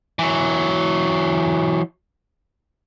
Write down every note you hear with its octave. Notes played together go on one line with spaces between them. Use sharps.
E3 F#3